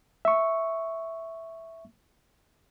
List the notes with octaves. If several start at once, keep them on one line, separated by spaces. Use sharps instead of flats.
E5 C#6